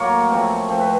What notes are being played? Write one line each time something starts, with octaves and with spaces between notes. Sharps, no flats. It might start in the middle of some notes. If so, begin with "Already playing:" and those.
Already playing: A2 F#3 A#3 C#5
F3 A3 C4
F3 A3 C4
B4